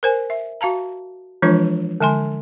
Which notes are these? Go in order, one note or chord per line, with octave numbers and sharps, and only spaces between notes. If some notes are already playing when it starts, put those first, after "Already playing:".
A#4 C5 G#5
E5
F#4 F5 A5 A#5
E3 F3 G#3 D4 F4 C#5
D3 G#3 G#5 C6